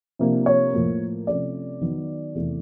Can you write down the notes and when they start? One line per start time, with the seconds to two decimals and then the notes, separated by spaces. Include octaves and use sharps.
0.19 C3 F3 A#3 D4
0.46 C#5
0.73 A2 F3 A#3
1.27 C3 F3 A3 C#4 D5
1.81 D#3 F#3 B3 D#4
2.35 E2 C3 E3 A3